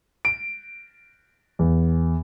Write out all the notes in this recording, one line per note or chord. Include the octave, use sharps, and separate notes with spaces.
D7
E2